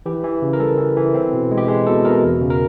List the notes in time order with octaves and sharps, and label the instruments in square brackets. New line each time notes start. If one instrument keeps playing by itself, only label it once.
[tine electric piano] E3 G4
E3
C#3
A#4
G3 A4
E3
E3
C4
B2
G#3
G4
G#3 G#4
B2 A4
B2 A#4
E2
C#3
A#4